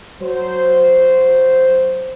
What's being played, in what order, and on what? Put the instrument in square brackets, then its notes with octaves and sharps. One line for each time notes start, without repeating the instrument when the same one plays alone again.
[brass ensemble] F#3 C5